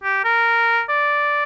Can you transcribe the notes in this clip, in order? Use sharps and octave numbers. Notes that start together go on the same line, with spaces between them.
G4
A#4
D5